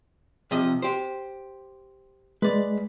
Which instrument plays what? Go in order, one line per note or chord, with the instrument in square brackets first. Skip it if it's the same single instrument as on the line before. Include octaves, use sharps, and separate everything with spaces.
[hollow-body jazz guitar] C3 F3 D#5
G4 C5
[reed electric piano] G#3 [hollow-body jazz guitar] B4 D5